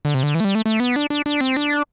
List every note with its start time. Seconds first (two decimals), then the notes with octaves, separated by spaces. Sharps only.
0.05 D3
0.14 C3
0.23 D3
0.35 E3
0.40 A3
0.45 G3
0.55 A3
0.66 A3
0.80 B3
0.96 D4
1.10 D4
1.26 D4
1.41 C4
1.57 D4